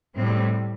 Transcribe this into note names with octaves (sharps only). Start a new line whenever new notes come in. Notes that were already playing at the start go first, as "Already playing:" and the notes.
A2 G3 C4